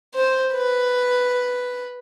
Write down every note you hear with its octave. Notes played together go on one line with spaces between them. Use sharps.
C5
B4